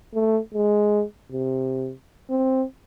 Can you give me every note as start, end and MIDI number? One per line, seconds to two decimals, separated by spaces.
0.15 0.39 57
0.54 1.04 56
1.33 1.92 48
2.30 2.64 60